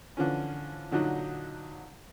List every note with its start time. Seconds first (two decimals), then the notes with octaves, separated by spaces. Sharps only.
0.17 D3 E3 F3 C#4
0.91 A#2 D3 F#3 D#4